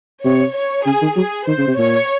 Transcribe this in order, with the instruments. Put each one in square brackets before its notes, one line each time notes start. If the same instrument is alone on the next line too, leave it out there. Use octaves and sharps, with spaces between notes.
[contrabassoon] C3 [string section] C#5
[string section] C#5
[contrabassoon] C#3 [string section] G#4
[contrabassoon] D#3
[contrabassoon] F#3 [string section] G#4
[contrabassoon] D#3 [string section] C5
[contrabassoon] C#3
C3
[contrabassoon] A#2 [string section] C#5